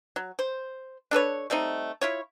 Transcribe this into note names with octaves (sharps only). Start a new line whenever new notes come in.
F#3
C5
D4 A4 B4 C#5
G3 A3 C4 D#4
E4 F4 C#5